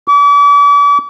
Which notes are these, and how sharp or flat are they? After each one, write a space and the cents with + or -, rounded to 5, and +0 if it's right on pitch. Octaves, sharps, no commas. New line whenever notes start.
D6 -40